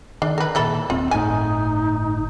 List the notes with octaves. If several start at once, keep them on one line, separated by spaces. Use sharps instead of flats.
D#3 D4
A#4 B4
A#2 D#3 E3 A4 B5
D#1 C4 F4
G1 A2 D#4 G#5